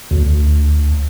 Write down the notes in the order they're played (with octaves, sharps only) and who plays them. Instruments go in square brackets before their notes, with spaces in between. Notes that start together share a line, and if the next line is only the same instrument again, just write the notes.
[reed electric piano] D2